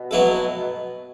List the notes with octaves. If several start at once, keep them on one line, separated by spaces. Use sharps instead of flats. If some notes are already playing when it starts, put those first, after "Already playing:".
Already playing: B2
F#3 B3 E4 A4